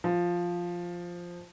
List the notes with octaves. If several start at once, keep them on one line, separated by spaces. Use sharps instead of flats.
F3